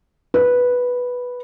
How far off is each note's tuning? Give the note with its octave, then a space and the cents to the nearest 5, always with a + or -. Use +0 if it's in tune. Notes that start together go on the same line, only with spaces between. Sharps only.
B4 -5